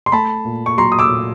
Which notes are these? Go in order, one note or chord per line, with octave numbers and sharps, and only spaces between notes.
C6
A3 A5 B5
A#2
C#6
F#3 A#5 C6
D#6
D6 E6
A#2